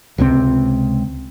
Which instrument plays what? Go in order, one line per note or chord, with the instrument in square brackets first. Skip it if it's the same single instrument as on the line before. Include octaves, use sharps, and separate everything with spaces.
[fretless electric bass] C#2 C3 F#3 C4